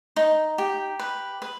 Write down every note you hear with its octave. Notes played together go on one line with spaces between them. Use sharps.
D#4
G4
B4
B4